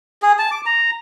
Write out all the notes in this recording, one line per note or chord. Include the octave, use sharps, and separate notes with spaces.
G#4
A5
D6
A#5